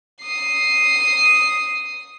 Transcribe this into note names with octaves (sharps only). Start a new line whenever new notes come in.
D#6 C7